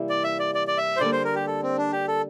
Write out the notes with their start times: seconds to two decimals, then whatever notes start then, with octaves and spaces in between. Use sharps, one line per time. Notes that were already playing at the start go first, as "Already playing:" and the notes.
Already playing: C3 E3 G3 A#3 E4
0.09 D5
0.24 E5
0.39 D5
0.55 D5
0.67 D5
0.78 E5
0.97 C5
1.00 D3 G3 A#3 D5
1.12 C5
1.24 A#4
1.35 G4
1.47 A4
1.63 C4
1.78 D4
1.92 G4
2.08 A4